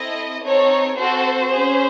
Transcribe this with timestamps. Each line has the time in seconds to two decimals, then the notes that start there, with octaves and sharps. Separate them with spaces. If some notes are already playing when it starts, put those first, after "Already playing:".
Already playing: C4 E4 A4 D#5
0.43 C4 D#4 A4 C#5
0.97 C4 F#4 A4 C5
1.52 C#4 G#4